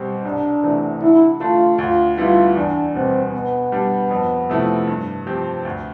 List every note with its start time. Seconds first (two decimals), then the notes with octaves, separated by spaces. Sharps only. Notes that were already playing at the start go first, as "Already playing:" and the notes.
Already playing: B2 G3 C4 G4
0.25 C2 D4
0.63 C3 E3 A3
1.02 D3 E4
1.40 A3 D4 F4
1.79 D2 F4
2.17 D3 G3 B3 E4 F4
2.56 E2 D4
2.94 B2 G3 B3 C4
3.33 B2 B3
3.72 G3 D4 G4
4.11 F2
4.50 C3 F3 A3 E4
4.87 G2
5.26 F3 C4 G4
5.65 D2